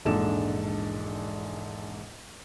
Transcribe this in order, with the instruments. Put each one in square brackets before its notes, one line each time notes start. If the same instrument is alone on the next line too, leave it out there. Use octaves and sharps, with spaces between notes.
[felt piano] E1 A#1 G#2 D4 A4 E7